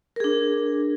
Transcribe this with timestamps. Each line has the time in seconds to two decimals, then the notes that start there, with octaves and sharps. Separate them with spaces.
0.16 A#4
0.20 G#4
0.24 D4